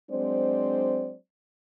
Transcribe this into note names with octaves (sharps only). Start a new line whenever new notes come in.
F#3 G#3 C4 D4 C5 D5